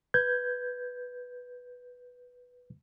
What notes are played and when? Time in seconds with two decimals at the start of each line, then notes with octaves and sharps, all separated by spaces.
0.14 B4 G6 G#6